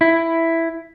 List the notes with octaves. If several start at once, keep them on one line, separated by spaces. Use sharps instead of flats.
E4